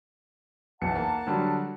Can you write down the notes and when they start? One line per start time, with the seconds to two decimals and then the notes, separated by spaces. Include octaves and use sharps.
0.81 B1 E2 F#5 A5 C#7
0.95 A#3
1.26 D3 F#3 G3